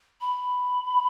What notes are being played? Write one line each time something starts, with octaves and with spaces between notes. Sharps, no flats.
B5